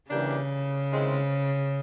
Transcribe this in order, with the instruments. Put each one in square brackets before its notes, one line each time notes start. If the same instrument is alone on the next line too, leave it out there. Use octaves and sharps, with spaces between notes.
[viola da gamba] C#3 [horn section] E3 G3 A#3 D4 G4
[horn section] C3 D#3 G#3 C4 E4